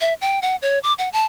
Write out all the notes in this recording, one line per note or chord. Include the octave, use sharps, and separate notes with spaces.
E5
G5
F#5
C#5
D6
F#5
A5